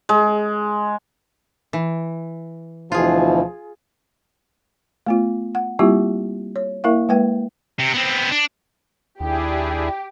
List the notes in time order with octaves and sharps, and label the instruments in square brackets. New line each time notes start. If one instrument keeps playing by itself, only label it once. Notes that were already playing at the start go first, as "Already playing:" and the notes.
[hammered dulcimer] G#3
[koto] E3
[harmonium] D2 B2 E3 [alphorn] F3 [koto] F4 G#4
[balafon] A3 B3 F4
F#5
G3 A#3 C4 E4 F4 G4
C#5
A#3 E4 A#4 E5 F5
G#3 A#3 B4 G5
[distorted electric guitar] C3
B3 C4
D4
[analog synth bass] D#2 [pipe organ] D4 E4 G#4 [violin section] G4